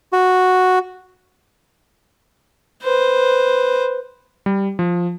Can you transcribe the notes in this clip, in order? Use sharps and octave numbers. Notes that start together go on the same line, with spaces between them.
F#4
B4 C5
G3
F3